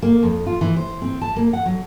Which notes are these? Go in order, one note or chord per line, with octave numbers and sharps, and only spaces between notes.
A#3
F2
F4
E3
C5
C4
A5
A#3
F#5
F#3